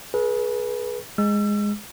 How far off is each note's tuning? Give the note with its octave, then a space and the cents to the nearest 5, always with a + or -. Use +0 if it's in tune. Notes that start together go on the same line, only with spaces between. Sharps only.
G#4 +25 B4 -25
G#3 -5 E6 +35